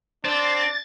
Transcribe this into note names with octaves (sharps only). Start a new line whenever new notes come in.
C4 D4 A6